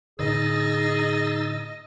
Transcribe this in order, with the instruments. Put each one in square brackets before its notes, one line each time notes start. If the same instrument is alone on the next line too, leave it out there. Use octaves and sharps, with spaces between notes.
[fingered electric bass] A2 D3 [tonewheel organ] D#4 E6 A6 [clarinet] G#4 [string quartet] D#5